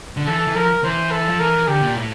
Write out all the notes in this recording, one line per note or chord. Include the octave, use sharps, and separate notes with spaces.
D3
E3 A4
E3
F3 A#4
E3 C5
A4
F3
E3 A#4
D3 G4
A#2
A2